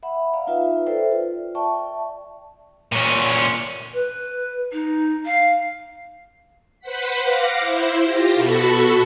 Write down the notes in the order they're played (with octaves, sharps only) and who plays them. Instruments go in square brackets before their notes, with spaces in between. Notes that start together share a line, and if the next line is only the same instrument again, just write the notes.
[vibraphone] E5 F#5 B5
D5 E5 F5 A#5
D#4 F4 B4 E5
A4 B4 C5 D5 E5 G5
F4
D5 E5 G5 A5 C#6
[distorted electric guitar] A#2 C#4
[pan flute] B4
D#4
F5
[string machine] B4 C5 F#5 B6
F5 F#5 D6 A#6
E4 C5
F4 G4 A#6
B2 F#4 A4 B5 C#6